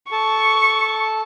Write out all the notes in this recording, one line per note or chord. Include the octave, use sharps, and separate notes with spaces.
A4 A5 C#6